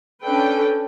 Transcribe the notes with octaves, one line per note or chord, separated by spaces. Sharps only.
C#4 D4 A4 B4 G5